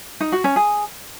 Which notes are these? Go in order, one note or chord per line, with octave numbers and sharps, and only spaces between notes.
D#4
F#4
C#4
G#4